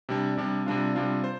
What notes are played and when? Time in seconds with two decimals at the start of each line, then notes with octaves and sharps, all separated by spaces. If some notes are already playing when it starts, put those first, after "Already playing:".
0.09 C3 G3 D4
0.37 C3 G3 D4
0.66 C3 G3 D4 F4
0.95 C3 G3 D4 F4
1.24 C5